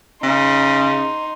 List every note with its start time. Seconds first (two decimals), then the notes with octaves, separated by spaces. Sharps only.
0.23 C#3 D#4 C6